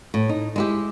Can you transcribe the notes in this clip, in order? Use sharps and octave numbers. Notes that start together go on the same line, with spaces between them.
A2
D#4
G#3 E4 G4